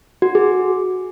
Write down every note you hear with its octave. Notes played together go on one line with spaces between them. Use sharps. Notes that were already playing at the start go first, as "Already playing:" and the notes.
F#4
G#4